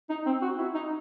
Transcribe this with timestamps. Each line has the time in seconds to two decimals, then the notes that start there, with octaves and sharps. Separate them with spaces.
0.10 D#4
0.26 C4
0.42 F#4
0.58 E4
0.74 D#4